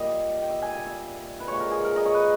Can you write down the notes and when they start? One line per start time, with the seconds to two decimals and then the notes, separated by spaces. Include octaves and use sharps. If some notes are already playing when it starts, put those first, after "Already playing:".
Already playing: A#2 G3 D#5
0.42 G5
0.50 E5
0.62 G#5
0.75 G#5
0.86 E5
1.40 B4
1.48 A#2 G#3 C#5
1.60 A#4
1.72 G#4
1.84 A#4
1.96 D#5
2.06 C#5
2.14 B4